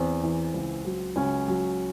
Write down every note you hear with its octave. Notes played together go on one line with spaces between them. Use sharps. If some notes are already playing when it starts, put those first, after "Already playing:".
Already playing: E2 C4
E3
C#2
F#3
C#2 C#4
F#3